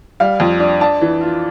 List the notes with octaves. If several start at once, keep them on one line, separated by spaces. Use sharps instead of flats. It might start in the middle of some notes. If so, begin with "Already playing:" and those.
G3 F5
F2
D4
D4 A5
E3
F4